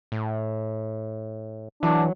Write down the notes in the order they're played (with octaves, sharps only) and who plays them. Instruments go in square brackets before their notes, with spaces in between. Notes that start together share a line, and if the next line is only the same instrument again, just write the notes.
[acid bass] A2
[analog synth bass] E3 [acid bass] F#3 [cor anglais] D4